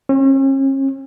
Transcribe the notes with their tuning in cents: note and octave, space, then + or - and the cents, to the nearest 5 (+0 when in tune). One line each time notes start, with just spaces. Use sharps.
C#4 -40